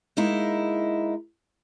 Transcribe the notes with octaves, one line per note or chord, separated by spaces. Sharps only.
G#3 A#3 D#4 E4